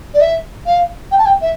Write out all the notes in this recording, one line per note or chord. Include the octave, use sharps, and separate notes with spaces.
D5
E5
F5
G5
A5
G5
E5